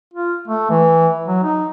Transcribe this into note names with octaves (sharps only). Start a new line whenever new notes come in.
F4
A3
E3
F#3
D#4